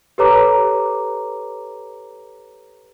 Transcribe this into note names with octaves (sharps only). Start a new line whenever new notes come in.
G4 A4 B4 C#5 A#5 D6